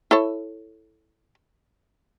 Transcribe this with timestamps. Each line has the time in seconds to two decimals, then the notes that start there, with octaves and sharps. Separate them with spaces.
0.11 E4 A4 C#5